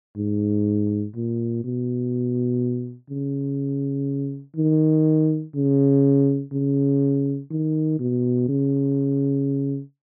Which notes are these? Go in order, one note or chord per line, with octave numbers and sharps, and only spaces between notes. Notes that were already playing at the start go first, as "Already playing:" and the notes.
G#2
A#2
B2
C#3
D#3
C#3
C#3
D#3
B2
C#3